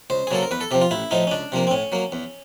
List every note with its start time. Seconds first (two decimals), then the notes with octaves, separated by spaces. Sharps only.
0.10 C#2 C5
0.27 G#4
0.31 C#3 F#3 A#3 A4
0.42 A#4
0.51 E2 B4
0.61 A4
0.71 C3 F3 G4
0.82 F4
0.91 A1 E4
1.11 A2 F3 A3 D#4
1.27 C#4
1.31 C#2 D4
1.52 C3 F3 A#3
1.67 C4
1.71 A2 C#4
1.92 F#3 A#3
2.12 E2